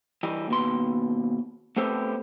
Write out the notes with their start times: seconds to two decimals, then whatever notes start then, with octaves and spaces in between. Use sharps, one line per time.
0.23 E3 G3 D#5
0.48 D#2 B2 C6
1.76 A3 B3 C4 G4 A4 C5